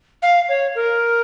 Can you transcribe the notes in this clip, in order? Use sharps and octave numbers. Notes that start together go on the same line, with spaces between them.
F5
C#5
A#4